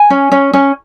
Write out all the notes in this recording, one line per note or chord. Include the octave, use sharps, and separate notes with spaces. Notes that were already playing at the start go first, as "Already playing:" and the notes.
Already playing: G#5
C#4
C#4
C#4